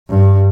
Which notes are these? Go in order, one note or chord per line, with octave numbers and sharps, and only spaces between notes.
G2